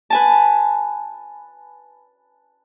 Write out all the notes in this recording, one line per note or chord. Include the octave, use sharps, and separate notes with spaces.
B4 G#5 A5